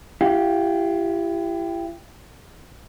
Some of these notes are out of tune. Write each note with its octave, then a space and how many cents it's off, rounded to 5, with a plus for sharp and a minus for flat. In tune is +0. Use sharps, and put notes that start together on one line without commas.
E4 +40 G4 +5 F5 +25